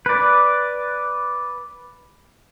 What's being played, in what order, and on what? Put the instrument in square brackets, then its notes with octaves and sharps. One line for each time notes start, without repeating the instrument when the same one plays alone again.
[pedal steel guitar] B4 D5